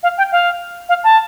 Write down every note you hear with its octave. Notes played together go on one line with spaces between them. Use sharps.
F5
G5
F5
F5
A5